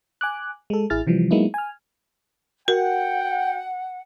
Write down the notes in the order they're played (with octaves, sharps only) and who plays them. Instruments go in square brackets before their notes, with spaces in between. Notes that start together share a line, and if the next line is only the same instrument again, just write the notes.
[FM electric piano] G#5 D6 F#6
G#3 A4
A1 E4 G#4 F6 A6
C3 E3 F3 G3
F#3 G#3 A#3 B3 D#4 E4
G#5 F6
[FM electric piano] F#4 [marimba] A#4 [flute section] F#5 [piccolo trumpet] G5